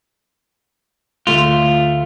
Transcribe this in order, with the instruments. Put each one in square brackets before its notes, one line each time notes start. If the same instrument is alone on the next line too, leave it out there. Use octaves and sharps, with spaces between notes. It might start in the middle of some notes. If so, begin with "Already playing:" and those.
[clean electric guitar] D2 A3 F4